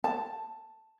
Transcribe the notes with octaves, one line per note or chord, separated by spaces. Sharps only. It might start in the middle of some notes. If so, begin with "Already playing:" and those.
A5